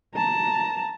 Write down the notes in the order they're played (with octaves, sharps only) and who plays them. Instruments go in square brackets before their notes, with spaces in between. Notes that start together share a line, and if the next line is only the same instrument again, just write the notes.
[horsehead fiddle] A5 A#5